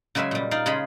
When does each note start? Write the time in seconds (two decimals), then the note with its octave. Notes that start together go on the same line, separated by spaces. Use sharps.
0.15 C#3 F#3 G#3 B4 E5 G#5
0.31 A#2 G3
0.51 D#4 D5 F5
0.66 C#3 G#3 F4 G#4 D#5 B5